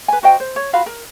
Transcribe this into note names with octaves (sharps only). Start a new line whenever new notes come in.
B4 G#5
F#4 C5 D#5 G5
C5
C#5
F4 F#4 F5 B5
A#4